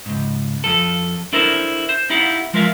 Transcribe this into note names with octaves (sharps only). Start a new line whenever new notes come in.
C#2 G#2
F2 F4 A4
D4 E4 A4 A#4 C5
C5
B3 D#4 E4 G4 F5 F#5
F3 G#3 F4 A#4 E5 F5